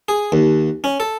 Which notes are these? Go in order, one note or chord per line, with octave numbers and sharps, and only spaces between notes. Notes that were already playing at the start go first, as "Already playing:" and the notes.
G#4
D#2
C#4
A4